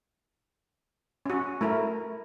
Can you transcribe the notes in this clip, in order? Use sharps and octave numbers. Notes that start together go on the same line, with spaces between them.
C#4 F#4
A3 E4 A#4